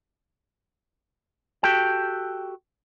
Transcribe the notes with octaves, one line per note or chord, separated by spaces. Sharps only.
F#4 G4 A4 G5